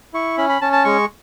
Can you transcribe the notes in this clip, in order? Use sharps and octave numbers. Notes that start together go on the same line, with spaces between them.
E4 C#6
C#4 B5
B5
C#4 A5
A5
G#3 C#6